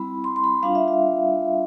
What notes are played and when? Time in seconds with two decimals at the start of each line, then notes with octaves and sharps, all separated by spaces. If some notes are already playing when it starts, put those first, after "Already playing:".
Already playing: G3 C4 E4 B5
0.24 C6
0.36 C6
0.44 B5
0.63 G3 D4 F4 F5
0.75 E5
0.88 E5